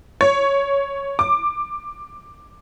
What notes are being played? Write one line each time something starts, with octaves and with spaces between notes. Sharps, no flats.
C#5
D6